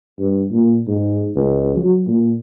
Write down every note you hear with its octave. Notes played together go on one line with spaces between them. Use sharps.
G2
A#2
G#2
C#2
F#3
A#2